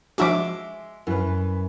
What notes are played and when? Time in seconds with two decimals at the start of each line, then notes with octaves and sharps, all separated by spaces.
0.18 F3 G#3 D4 F#4 E5 D6
1.07 F#2 E3 B4